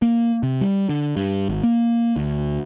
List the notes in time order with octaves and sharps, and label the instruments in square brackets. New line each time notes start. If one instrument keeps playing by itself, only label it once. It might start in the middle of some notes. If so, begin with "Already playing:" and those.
[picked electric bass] A#3
C3
G3
D3
G2
G#1
A#3
D2